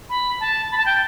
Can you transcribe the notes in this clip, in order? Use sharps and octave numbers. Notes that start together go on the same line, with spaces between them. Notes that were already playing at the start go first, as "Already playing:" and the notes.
B5
A5
B5
A5
G5